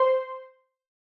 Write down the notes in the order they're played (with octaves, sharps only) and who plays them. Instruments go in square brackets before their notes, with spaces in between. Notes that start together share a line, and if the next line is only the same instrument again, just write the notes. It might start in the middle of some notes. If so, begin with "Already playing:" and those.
Already playing: [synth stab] C5 C6